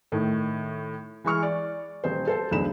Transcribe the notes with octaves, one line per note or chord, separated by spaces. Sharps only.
A2 D#3
E3 G#3 C#6 F6
D5
D#1 C5
A4 C5 A5
B1 E2 G2 D3 B5 E7